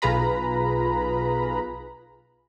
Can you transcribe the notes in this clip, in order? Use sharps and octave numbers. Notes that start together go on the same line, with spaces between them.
B1 F4 G#4 B4 A#5 B5